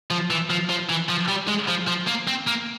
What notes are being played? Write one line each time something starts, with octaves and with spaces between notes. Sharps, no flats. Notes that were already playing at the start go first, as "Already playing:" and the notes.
F3
E3
F3
F3
E3
F3
G3
G#3
F3
F3
A#3
C4
A#3